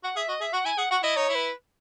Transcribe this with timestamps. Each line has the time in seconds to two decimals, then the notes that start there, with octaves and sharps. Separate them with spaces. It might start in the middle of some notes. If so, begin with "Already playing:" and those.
0.03 F#4 F#5
0.16 G#4 E5
0.28 F#4 D#5
0.41 G#4 E5
0.53 F#4 F#5
0.65 E4 G#5
0.78 G#4 F#5
0.91 F#4 F#5
1.03 E4 D#5
1.16 D#4 C#5
1.29 E4
1.35 B4